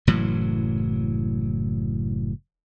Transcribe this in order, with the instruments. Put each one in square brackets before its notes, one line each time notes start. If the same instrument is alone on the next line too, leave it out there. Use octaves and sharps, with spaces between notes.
[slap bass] F#1 A2 E3 F#3